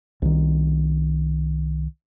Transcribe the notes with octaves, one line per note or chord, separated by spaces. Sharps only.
C2 D#3